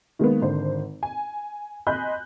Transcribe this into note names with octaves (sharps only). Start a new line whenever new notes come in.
D#3 G#3 A#3 B3
G#1 D3 C5
G#5
D#5 G#5 B5 C6 F#6 G6